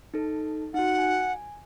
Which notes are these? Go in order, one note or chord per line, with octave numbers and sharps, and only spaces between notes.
D#4 A4
D#4 F#4 F#5
G#5